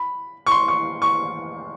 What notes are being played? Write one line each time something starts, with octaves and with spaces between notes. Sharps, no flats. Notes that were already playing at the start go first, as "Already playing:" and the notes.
Already playing: B5
C#6
C6
C#6
C#6